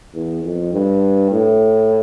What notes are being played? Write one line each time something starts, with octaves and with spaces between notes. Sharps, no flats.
E2
F2
G2
A2